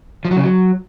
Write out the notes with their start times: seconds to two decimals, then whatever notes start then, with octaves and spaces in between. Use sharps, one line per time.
0.25 F3
0.31 F#3
0.37 C#3
0.43 F#3